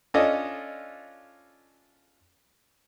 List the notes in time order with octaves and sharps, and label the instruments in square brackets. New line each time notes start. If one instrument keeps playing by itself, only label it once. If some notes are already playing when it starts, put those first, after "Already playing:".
[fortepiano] C#4 D4 F4 A4 D#5